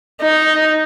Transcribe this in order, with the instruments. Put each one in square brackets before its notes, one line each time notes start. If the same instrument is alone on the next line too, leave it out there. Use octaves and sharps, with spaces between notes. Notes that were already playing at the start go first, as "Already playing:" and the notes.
[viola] D#4